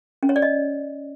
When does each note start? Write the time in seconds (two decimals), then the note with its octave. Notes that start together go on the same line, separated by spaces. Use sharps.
0.23 C#4
0.29 C#5
0.36 D5
0.42 D#5